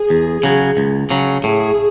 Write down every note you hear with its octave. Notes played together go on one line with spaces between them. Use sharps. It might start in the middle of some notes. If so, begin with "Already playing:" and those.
Already playing: G#4
E2
C#3 F#3
C#2
C#3 F#3
A2 G#4